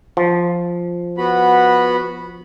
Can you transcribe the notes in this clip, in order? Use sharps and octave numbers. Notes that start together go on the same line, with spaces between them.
F3
B3 F#4 B5